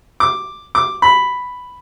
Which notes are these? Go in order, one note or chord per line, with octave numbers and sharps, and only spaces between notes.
D6
D6
B5